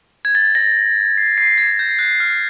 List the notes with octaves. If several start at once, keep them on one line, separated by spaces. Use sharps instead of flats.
G#6
A6
A#6
C7
C7
G#6
G6
F#6
F6